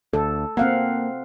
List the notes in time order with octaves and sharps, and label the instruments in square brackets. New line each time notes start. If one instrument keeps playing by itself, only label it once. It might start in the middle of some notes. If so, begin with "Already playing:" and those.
[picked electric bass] D2 [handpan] A4
[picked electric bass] A#3 [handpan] C4 F5 F#5